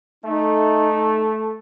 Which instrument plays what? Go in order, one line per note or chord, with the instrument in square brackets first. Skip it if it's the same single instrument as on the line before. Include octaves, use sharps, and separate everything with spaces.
[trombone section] A3 [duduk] D#4